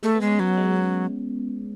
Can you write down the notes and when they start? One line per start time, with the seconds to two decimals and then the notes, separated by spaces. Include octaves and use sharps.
0.03 G#3 A3
0.15 B3
0.21 G#3
0.27 C#4
0.39 F#3 B3
0.57 G#3